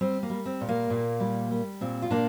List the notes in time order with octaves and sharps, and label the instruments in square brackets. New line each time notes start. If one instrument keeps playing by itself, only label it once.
[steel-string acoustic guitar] G3 C4
A#3
G3
C4
A#2
A#3
A#2
G3
G3
A#2 C4
F4
A#2 A#3 D4